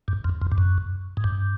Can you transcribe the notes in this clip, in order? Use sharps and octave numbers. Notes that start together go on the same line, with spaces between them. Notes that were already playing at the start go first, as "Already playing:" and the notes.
G2
F2
F2
G2
F#2
G#2
G2